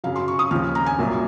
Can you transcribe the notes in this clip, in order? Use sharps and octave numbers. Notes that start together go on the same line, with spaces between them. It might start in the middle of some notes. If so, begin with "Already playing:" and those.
F#2 C#3 F#3 F5
C6
C#6
D#6
D#2 C#3 F3 F6
A#5
G#5
C2 A#2 F#3 A#3